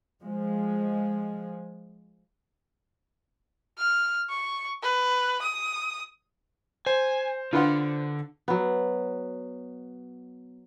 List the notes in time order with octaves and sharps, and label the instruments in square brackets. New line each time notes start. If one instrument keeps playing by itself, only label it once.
[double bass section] F3 G#3
[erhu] F6
C#6
B4
D#6
[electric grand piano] C5 [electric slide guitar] G#5
[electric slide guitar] D3 [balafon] D4 F#5 [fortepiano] F4 B4 C6
[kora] F#3 B3